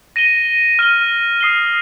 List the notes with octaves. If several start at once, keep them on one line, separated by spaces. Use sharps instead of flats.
A#6 D#7 G7
F6 D#7 G7
D#6 C7 G7